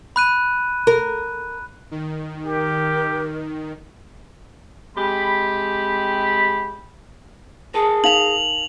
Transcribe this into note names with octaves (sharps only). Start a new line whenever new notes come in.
B5 F#6 D#7
A#4
D#3
G4 A#4
C3 G#3 G4 B5
G#4 A#4 G#5 A5
D#4 F5 F7 F#7